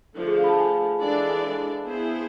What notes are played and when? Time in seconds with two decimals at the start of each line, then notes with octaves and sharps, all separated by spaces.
0.17 D3 F3 A3
0.27 G#4
0.38 F5
0.44 B5
0.49 A5
0.59 G#5
1.01 E3 G#3 D4 A4 D5
1.84 B3 E4 G#4 C5